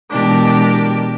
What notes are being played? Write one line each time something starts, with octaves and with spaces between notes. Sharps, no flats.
B2 E3 G#3 D4 G4 A#4